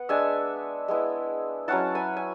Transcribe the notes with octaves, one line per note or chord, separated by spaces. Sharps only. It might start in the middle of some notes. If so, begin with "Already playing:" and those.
Already playing: B3 F#5
G#3 D4 E5 G#5
G#3 B3 E4
F#3 C#4 E4 F#5 A5
G#5 B5
G#5